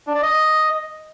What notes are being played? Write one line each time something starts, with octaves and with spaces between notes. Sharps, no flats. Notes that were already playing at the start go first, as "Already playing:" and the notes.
D4
D5
D#5